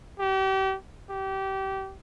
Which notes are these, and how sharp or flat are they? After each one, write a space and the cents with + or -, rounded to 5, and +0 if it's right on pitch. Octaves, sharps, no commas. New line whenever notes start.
G4 -35
G4 -25